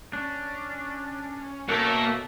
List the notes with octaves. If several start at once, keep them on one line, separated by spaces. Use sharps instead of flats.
C#4 D4
B2 A3 A#3 F#5